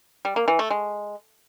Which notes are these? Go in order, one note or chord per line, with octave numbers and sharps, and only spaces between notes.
G3
A#3
E3
A3
G#3